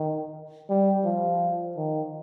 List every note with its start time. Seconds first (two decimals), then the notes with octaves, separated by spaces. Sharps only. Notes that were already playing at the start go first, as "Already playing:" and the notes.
Already playing: D#3
0.69 G3
1.05 F3
1.77 D#3